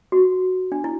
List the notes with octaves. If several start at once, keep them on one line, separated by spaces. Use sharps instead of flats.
F#4
D4
E4